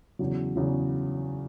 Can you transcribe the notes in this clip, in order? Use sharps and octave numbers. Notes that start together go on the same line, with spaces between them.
E2 C#3 F#3
E2 C#3 F#3